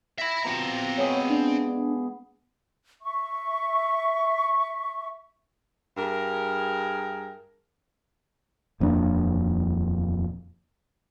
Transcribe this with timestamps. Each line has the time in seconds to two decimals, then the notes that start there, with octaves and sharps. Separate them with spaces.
0.18 E5 G5 B5 A#6
0.45 B2 F3 C4 G4 A#5
0.98 G#3 B3 G#4 C#5
1.29 D4
3.02 E5 C#6
5.98 G2 G#4 A#4
8.80 D#1 F2 A#3 D4